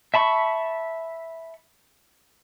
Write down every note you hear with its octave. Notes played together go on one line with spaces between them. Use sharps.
E5 A5 B5 C#6